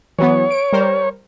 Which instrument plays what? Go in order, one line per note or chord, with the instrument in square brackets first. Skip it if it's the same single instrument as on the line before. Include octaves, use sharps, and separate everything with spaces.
[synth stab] E3 F#3 B3 [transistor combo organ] C#5
[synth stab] D7
G3 A#4 C5